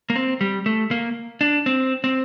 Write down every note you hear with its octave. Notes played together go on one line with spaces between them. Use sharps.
A#3
C4
G3
A3
A#3
D4
C4
C4